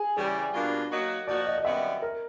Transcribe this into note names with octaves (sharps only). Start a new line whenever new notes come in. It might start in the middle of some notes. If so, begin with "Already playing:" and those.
Already playing: G#4
C#3 E3 G3 G#4
B2 G3 A#3 D4 F4
F#3 A#3 D#4 F#4
F3 A#3 D#4 F#4 D5
D#5
D#5
F#2 D#3 G3 B3 E5
A#4